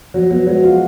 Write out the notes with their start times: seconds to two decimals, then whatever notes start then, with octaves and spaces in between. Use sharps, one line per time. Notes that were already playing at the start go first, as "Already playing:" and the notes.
0.14 F3 F#3
0.30 F#3 B3
0.47 F#3 G#3
0.64 F4 F#4